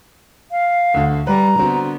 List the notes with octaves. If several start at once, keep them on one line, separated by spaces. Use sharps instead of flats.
F5
D2 D3
G3 B4 A#5
D3 B3 C4 F#4